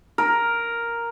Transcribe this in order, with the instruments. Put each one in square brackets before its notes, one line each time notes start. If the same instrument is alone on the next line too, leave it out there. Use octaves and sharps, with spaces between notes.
[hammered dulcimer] A#4